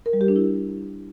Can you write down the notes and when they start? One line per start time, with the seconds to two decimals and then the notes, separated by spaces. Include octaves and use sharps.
0.06 A#4
0.13 G3
0.21 G4
0.28 D4
0.36 E4